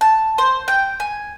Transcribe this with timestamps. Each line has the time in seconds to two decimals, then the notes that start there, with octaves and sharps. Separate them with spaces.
0.01 A5
0.38 C5
0.68 G5
1.00 G#5